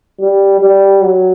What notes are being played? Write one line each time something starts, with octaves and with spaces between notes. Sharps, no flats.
G3
G3
F#3